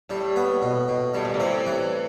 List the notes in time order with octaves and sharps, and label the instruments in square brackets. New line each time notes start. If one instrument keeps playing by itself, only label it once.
[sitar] A2 [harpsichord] G3
[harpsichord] B3
B2
B2
[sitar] A2 [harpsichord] G3
[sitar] A#2
A2
[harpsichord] C4
E3